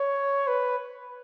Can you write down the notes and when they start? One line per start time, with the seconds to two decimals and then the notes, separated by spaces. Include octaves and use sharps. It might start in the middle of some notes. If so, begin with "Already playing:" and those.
Already playing: C#5
0.48 B4